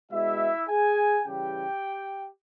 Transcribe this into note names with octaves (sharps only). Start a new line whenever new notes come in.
B2 G#3 E4 E5
G#4 G#5
C#3 E3 G3 G4 G5